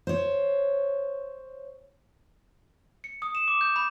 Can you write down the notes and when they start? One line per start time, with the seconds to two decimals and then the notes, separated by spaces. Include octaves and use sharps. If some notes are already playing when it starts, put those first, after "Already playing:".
0.07 C5 C#5
3.04 C#7
3.22 D#6
3.35 E7
3.48 D6
3.61 G6
3.76 B5